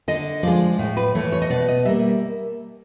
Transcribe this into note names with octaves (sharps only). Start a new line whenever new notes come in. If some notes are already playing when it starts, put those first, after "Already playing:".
D3 D#5
F3 G#3 D5
A2
B4
E3 A3 C#5
C#5
D#5
B2 D5
D#5
G3 A#3 E5